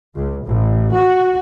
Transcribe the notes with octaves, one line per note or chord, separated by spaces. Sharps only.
C#2
A1
F#4